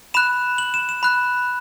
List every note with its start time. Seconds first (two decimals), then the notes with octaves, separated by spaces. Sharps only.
0.14 B5 F#6 E7
0.58 F#7
0.74 E7
0.89 E7
1.03 B5 F#6